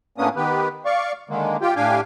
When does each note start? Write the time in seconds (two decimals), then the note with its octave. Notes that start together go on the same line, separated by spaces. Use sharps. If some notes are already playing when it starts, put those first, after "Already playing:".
0.18 A2 A#3 B3 C#4 D4 D#6
0.36 D#3 B3 G4 B4
0.85 D5 F5 C#6
1.29 D3 D#3 G#3 A#3
1.61 F4 G4 G5
1.76 A2 D4 G4 F5 G5 G#5